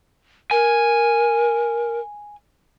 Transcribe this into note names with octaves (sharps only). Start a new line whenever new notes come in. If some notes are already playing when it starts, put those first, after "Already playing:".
A#4 G#5